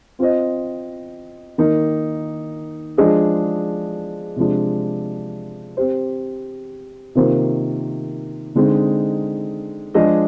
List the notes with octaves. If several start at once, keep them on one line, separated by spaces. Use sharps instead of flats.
C4 F4 C5 D#5
D#3 A#3 D#4
F3 G#3 D4 G#4 D#5
C3 F3 G#3 D4
C4 G4 C5
C3 D#3 A#3 F4 C5
D3 G#3 C4 D#4
F3 G#3 D4 G#4 D#5